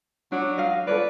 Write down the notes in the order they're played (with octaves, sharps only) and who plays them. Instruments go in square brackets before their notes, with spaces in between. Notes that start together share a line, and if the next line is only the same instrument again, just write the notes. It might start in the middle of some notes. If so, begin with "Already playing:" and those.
[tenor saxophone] F#3 [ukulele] D4
[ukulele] D#5 F5
[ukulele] A4 C#5 D5 [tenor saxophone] B4